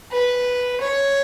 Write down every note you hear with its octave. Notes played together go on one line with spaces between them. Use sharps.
B4
C#5